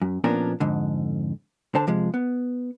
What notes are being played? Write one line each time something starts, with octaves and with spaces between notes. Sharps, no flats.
F#2
A#2 F3 B3 C#4 D4 A#4
F2 G#2 D3
D3 C5 A5
C3 F3 G#3
B3